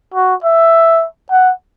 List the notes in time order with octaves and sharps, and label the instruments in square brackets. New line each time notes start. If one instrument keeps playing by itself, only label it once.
[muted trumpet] F#4
E5
F#5